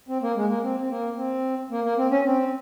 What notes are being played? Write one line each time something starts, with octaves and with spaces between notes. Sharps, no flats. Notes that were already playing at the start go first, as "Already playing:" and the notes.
C4
A#3
G#3
A#3
C4
C4
A#3
C4
A#3
A#3
C4
C#4
C4